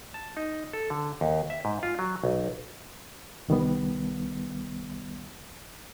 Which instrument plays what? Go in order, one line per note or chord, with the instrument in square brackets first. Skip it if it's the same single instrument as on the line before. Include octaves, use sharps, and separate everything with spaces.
[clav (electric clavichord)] A5
D#4
A4
D3
D#2
E5
G#2
F4
F#3
B1
[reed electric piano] C2 D#3 G3 B3